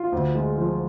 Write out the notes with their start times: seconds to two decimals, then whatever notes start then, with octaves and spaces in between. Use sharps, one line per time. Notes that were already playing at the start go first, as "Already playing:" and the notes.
Already playing: F4
0.12 D2
0.35 G#3
0.58 F3